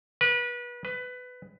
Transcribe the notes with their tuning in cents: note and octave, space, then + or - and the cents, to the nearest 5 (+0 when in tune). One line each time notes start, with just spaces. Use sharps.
B4 -30
B4 +15